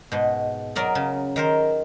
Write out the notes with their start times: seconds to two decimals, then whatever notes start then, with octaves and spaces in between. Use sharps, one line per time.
0.12 G#2 B2
0.75 F#3 A#4 D5 D#5
0.95 C#3
1.36 D#3 A#4 C5